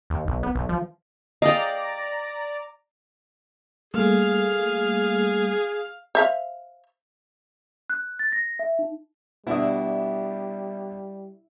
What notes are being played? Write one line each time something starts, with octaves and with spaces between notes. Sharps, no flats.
D#2
B1
B3
B1
F3
D5 D#5 F5 G5 A#5
G3 A3 A#3 G#4 F5
C5 E5 F5
F#6
A6
A#6
E5
D#4
B2 G3 D4 E4 D#6